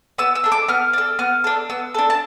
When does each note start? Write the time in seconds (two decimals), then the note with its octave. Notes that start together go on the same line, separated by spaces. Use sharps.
0.18 B3 E6
0.35 E6
0.44 D4 A4
0.52 D6
0.68 B3 F6
0.93 D4 A4
1.19 B3 F6
1.44 D4 A4
1.70 B3 E6
1.94 D4 A4
2.10 A5